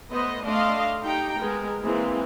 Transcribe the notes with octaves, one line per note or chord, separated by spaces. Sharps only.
A3 B3 B4 C5 D#5
A3 D4 D#5 F5 C6
D#4 G4 G5 A#5
G#3 B3 A#4
E3 G#3 A#3 C4